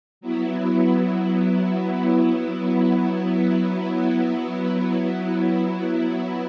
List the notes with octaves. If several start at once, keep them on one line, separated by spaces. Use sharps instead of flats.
F#3 B3 E4